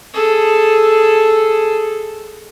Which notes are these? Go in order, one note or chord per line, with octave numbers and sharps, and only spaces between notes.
G#4 A4